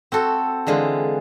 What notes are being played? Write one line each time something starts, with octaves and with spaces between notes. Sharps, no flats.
C4 F#4 A4
D3 E3 G#3 F4